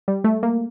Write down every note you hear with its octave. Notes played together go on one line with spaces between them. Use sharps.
G3
A3
A#3